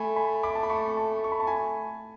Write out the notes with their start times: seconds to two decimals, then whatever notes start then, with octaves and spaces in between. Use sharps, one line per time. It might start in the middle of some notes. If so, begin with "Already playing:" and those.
Already playing: A3 G#5 B5
0.16 G#5 B5
0.43 B5 D6
0.55 A5
0.63 B5
0.70 A5 C#6
0.97 A5 C#6
1.24 C#6
1.32 B5
1.40 A5
1.47 G#5 B5